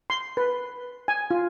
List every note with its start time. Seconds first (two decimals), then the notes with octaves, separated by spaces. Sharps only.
0.10 C6
0.37 B4
1.08 G#5
1.31 F4